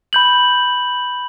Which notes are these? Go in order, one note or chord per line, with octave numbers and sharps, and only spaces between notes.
B5 G6 F#7